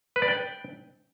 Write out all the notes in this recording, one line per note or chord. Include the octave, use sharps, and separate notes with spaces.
B4
D5
G5